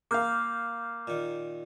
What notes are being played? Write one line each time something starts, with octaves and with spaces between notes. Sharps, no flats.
A#3 F5 D6 F6 G6
A#2 D#3